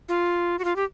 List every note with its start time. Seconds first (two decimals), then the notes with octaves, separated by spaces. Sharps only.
0.08 F4
0.59 F#4
0.64 F4
0.76 G4